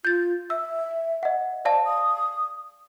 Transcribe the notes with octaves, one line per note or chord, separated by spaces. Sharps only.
F4 G6 A6
E5 E6
D#5 F#5
C5 D5 F5 A5
D#6